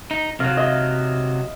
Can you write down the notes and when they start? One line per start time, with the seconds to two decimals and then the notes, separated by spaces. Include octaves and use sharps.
0.11 D#4
0.40 C3 F#3 F5
0.57 D#5 E5